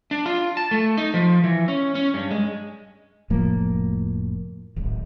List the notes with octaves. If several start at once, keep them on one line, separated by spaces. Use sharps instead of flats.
D4
F4
A5
A3
D#4
F3
E3
C#4
C#4
G2
G#3
F1 A2 F3 A#3
D1 G#1